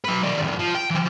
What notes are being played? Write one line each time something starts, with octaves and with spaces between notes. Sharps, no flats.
F#3 B4
D#3 D5
F2 A2
F3
G5
E3 F3